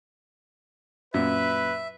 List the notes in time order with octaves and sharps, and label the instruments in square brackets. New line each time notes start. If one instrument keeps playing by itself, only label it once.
[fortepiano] F#2 A#2 [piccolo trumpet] B4 [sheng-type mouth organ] E5